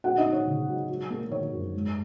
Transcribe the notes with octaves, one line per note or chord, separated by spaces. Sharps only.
C#4 F#4 F#5
D#4 D#5
C#4
C#5
C#3
F#3
F#3
A#3
D#3 C#5
F#2
G#2